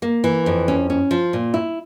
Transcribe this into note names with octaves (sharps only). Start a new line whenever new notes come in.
A#3
E3
F2
C#4
C#4
F3
A#2
E4